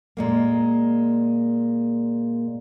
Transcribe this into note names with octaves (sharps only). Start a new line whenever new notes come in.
A#2 G#3 A#3